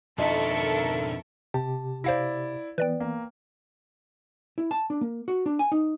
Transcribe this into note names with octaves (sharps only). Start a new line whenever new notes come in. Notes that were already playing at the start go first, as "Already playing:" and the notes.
F2 B2 D4 D#4 A4 A#4 E5 C#6
C3 G4 A5
E4 C5 D5 F5 A#6
E3 B3 B4 D5 G5
A#3
E4
A5
D4
A#3
F#4
D4
G#5
D#4